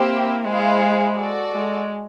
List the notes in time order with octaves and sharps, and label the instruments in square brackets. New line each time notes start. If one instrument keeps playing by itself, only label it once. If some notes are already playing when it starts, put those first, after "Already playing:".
Already playing: [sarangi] A#3 [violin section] C4 E4 G4 C5 E5
[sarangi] G#3 [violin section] E4 G#4 C5 F5
[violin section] F#4 A4 D5
[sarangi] G#3